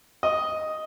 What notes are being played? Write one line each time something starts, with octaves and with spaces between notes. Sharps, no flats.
D#5